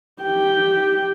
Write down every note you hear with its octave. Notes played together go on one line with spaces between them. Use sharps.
G4 G5